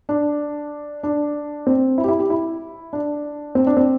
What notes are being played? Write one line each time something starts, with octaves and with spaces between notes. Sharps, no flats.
D4
D4
C4
E4
G4
E4
G4
E4
D4
C4
D4
C4